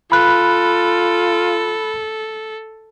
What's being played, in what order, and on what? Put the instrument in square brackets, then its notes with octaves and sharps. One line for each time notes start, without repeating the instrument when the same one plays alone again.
[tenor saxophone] F4 [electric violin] A4 [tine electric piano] B5 F#6